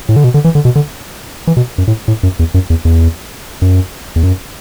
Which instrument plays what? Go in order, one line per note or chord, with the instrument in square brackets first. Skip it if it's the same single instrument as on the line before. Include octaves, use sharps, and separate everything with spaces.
[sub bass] A2
D3
B2
D3
E3
D3
B2
D3
E3
B2
F#2
A2
A2
F#2
E2
F#2
E2
E2
F#2
E2
F#2